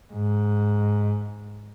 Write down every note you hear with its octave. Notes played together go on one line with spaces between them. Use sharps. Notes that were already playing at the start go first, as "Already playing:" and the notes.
G#2